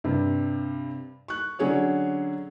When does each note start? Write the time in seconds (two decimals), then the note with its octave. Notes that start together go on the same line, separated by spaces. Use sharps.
0.04 G2 C3
1.28 C#6 F#6
1.59 D3 F#3 C#4 G#4 C#5 D5